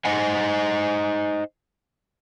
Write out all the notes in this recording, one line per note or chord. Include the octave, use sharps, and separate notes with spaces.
D#4 C5 D#5 F#5 G#5